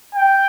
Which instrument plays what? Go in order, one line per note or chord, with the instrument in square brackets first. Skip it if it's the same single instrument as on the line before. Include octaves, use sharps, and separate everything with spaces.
[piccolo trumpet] G5